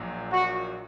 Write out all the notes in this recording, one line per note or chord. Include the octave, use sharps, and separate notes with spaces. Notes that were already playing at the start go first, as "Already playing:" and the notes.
Already playing: A#1 A#2 F#3
F#4